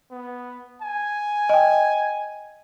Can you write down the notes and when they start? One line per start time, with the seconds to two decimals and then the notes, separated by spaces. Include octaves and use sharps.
0.11 B3
0.82 G#5
1.49 D#5 G5